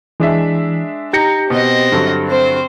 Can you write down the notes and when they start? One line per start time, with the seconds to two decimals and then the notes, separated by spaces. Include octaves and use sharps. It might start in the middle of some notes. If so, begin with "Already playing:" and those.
0.20 E3 G#3 D4 E5
1.13 D#4 G4 G6 A#6 C#7
1.50 B2 C4 D#5
1.92 G2 D3 F#3
2.28 C4 C5